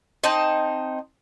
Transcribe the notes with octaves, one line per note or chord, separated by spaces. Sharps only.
C4 D#4 A5